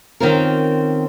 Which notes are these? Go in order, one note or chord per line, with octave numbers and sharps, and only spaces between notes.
D#3 C4 C#4 F4 A#4